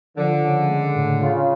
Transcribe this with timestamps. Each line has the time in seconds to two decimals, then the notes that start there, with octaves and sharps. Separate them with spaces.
0.17 D3 F3
0.43 C#3
0.69 G#3
0.96 A2
1.21 C#3 F4